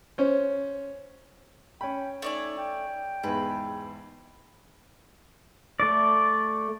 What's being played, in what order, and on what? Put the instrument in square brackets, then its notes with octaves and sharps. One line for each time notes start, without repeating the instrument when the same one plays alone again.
[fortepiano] C#4 C5
[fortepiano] C#4 B5 [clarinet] G5
[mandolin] A3 D5 G#5 [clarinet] D#4
[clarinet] G5
[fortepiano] E2 G#2 [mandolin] B4
[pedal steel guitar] A3 D5